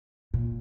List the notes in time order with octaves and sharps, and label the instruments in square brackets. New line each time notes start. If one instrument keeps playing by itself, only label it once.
[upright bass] A#2